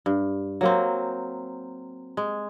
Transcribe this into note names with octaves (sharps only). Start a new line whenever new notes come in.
G2
F#3 A#3 C4
G#3